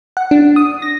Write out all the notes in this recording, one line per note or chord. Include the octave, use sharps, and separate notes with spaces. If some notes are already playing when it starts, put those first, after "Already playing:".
F#5
D4
D#6
A#6